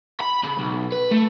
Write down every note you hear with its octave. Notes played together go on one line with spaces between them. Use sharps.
B5
C#3
B1
B4
A3